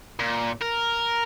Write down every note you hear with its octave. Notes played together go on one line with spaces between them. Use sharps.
A#2
A#4